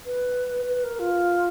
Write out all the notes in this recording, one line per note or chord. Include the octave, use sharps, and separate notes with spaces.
B4
B4
A#4
F4